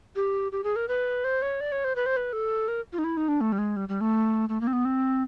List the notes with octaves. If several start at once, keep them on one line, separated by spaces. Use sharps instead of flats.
G4
G4
G#4
A#4
B4
C5
C#5
D5
C#5
C5
B4
C5
B4
A4
A#4
F4
D#4
E4
D#4
D4
A3
G3
G#3
G3
G3
A3
A3
A#3
C4
B3
C4